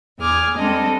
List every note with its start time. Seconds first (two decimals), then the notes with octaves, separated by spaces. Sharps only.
0.18 E2 G#4 D6 F6 G#6
0.57 G3 G#3 C4 D4 A4 D#5